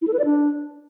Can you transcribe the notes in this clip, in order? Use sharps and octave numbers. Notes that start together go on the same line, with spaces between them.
E4
A4
B4
D5
D4